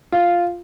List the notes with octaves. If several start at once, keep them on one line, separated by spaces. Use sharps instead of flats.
F4